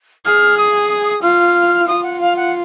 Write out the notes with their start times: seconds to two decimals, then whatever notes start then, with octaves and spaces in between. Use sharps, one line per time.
0.25 G#4 F6
0.57 D#6
1.22 F4 F6
1.87 F4 D#6
2.03 F#5
2.20 F5
2.36 F#5